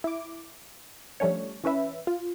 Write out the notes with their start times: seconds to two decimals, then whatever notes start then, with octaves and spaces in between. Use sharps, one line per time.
0.04 E4 D6
1.20 F3 G3 A3 C#4 D4 C#5
1.64 E3 C#4 B4 E5
2.07 F4